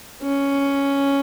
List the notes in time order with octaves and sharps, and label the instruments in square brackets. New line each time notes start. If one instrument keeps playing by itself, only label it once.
[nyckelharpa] C#4